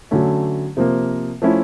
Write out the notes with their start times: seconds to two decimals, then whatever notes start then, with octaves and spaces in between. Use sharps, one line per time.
0.11 D3 F#3 A3 C#4
0.77 C3 F3 A#3
1.42 F3 A3 C#4 E4